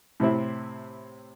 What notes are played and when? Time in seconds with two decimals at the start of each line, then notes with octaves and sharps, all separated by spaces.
0.20 A2 C3 C4 E4